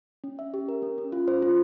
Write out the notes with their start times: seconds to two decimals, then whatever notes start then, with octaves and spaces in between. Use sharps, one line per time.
0.24 C#4
0.39 E5
0.54 G4
0.68 A#4
0.82 C#4
0.98 C#4
1.12 F4
1.28 C5
1.42 F4